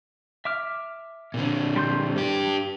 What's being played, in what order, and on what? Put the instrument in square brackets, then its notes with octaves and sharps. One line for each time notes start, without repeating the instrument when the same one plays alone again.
[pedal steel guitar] E5 D6 F6
[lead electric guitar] A#2 D3
[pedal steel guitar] G3 C6 G6
[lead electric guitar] G2 G4